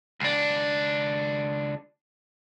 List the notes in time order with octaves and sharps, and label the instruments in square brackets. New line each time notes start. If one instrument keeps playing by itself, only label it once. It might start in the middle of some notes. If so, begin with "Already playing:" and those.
[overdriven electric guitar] C#2 D4